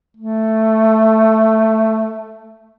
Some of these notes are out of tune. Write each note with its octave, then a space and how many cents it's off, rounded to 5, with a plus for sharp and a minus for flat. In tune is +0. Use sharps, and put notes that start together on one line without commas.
A3 +5